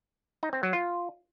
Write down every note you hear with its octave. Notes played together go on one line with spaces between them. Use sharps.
D#4
C4
F#3
F4